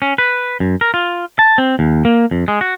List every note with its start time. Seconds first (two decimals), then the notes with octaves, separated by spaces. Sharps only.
0.02 C#4
0.18 B4
0.60 F#2
0.81 A#4
0.94 F4
1.39 A5
1.58 C4
1.79 D#2
2.05 A#3
2.31 F2
2.48 G#3
2.61 F#4